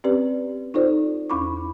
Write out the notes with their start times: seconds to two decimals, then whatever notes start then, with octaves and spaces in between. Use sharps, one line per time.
0.04 C4 C#4 G4 B4 D5
0.74 D#4 F4 A4 C5 D5
1.30 E2 C#4 E4 B5 C#6 D6